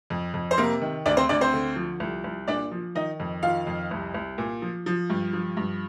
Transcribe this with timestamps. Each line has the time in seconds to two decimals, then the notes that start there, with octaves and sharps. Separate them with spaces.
0.10 F2
0.34 F2
0.51 C5
0.57 C3 A#3 A#4
0.81 D#3
1.06 D2 D4 D5
1.17 C4 C5
1.29 D2 D4 D5
1.41 C4 C5
1.53 D3
1.76 F3
2.00 C2
2.24 C2
2.47 A#2 D4 D5
2.71 F3
2.95 D#3 D#4 D#5
3.20 F2
3.43 D#3 F4 F5
3.67 F2
3.91 C2
4.14 C2
4.38 A#2
4.62 F3
4.86 F3
5.10 G2
5.33 F3
5.57 G2